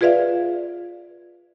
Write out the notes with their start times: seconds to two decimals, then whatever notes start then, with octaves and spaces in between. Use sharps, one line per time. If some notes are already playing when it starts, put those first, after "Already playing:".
0.01 F4 G#4 B4 D5 E5 F5